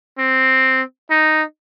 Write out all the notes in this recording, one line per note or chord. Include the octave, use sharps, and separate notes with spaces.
C4
D#4